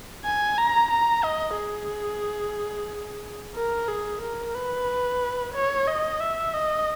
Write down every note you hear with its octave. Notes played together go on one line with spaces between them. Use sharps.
G#5
A#5
A#5
D#5
G#4
A#4
G#4
A#4
B4
C#5
D#5
E5
D#5